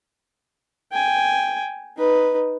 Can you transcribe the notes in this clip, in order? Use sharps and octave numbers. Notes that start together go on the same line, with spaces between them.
G5 G#5
D#4 B4